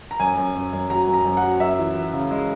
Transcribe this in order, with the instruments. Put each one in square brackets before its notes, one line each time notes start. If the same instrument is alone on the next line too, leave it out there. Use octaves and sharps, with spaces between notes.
[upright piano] A#5
F#2 G#5
F#2
F#2
F#2
F#3 A#5
F#2
A#5
F#2
F#5
F#3
F#2 E5
E3
E3
C#3
G#3